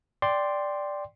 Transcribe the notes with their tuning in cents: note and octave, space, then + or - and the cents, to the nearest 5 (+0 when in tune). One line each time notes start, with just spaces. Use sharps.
D5 +0 G5 +0 C6 +0